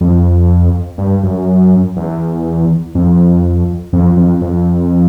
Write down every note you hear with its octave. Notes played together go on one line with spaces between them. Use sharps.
F2
G2
F#2
E2
F2
F2
F2
F2